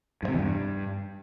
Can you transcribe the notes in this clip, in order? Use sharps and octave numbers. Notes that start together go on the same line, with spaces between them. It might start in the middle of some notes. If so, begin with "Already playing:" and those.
G2
C3
E2
G2